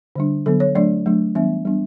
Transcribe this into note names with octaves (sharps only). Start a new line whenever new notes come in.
D3 G3 D4
D3 F#3 B3 A4
C#5
F#3 A3 D4 D5
F#3 A3 D4
E3 G3 B3 D4 E5
G3 B3 D4